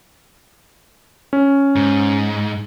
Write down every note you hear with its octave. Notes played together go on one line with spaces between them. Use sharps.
C#4
G#2